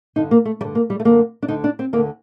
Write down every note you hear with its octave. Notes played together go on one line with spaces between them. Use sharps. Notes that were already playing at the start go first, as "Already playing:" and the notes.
G2 D3 D#4
A#3
A3
G2 D3 G3
A#3
G3
A3
F#2 D3 A#3
D4
D2 D3 D#4
D4
C4
D2 A#3
D3